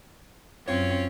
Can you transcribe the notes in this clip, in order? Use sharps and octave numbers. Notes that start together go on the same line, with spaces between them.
F#2 C4 C#4 F4 C#5